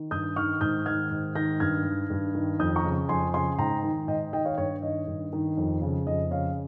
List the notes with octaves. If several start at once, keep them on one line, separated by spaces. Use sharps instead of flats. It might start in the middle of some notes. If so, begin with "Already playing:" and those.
Already playing: D#3
G2 D#6 G6
D#3 C#6 F6
G#2 D#6 G6
D#3 F6 G#6
G#2
D#3 G6 A#6
G2 F6 G#6
D#3
G2
D#3
F2 D#6 G6
A#5 C#6
C#3
F2 G#5 C6
C#3 G#5 C6
G#2 G5 A#5
D#3
G#2 D#5 G5
D#3 D#5 G5
C#5 F5
G2 C#5
D#3 D#5
G2
D#3
F2
C#3
F2 D#5
C#3 C#5 F5